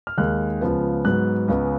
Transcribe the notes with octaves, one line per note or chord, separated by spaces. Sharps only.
F6
D#2 D#3 G#3 F#6
C#2 C#3 F3 B3
G#2 F#3 B3 F#6
C#2 C#3 G#3 B3